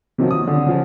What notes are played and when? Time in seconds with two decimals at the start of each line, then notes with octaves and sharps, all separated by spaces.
0.18 C3 D#3 F3 F#3
0.31 D#6
0.47 D3
0.66 C#3 F3